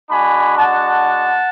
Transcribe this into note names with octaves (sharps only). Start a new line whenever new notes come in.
G#3 D4 F#4 G#5 B5
F#5 A5